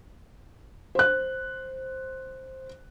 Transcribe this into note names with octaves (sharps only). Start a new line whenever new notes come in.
C5 F#6